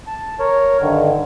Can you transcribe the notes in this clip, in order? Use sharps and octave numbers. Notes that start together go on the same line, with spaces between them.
A5
A#4 C#5
G2 D3 D#3